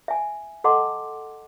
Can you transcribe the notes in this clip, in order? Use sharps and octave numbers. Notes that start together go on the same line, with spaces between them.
E5 G#5
A4 D#5 F#5 A5 C6 D6